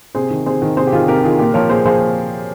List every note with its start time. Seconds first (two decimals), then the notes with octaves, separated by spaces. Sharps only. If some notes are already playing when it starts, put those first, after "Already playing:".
0.15 C3 G#4 C5
0.30 D#3
0.46 C3 G#4 C5
0.62 D#3
0.77 C3 G#4 C5
0.87 G4
0.92 D#3 F4 G#4
1.08 C3 G4 A#4
1.23 D#3 F4 G#4
1.39 A#2 G4 A#4
1.54 F3 A#4 C#5
1.69 A#2 G#4 C5
1.85 F3 G#4 C5